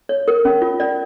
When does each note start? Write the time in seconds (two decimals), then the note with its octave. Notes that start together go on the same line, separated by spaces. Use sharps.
0.09 C#5
0.28 A#4
0.45 C#4
0.62 F4
0.80 C#4 D5